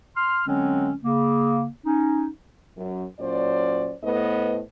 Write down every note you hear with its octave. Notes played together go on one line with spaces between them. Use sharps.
C6 F6
D3 F#3 G#3 C4 C#4
C#3 A#3
C#4 D#4
F#2
A#2 F#3 C#4 C5 D5
A2 A3 B3 B4 C5 D#5